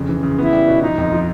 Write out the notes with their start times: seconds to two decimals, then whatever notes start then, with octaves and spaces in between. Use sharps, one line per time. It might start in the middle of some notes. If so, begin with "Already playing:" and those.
Already playing: F2 C#3
0.09 E3
0.23 C#3
0.38 B3 E4
0.52 G3
0.68 B2
0.82 F3 D#4
0.98 F2
1.13 F3